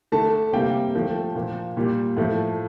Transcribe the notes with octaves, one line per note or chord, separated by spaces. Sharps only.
D3 A3 A5
C3 G3 A#3 G5
D3 F3 A3
A#2 F3 A#3
A#2 G3 A#3
A2 F3 A3